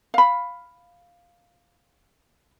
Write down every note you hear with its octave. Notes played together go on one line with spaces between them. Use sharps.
F5 B5